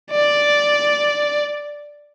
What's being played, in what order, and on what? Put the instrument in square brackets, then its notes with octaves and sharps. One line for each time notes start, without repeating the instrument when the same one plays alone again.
[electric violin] D5